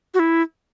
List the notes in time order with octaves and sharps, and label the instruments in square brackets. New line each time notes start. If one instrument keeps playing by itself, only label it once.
[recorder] F#4
E4